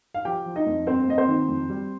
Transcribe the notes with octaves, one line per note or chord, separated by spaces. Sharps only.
F5
F3 G4 G5
F3
D#4 D#5
F2
G2 C4 C5
A#3 D#5
C4 C5
D#3
F2
G3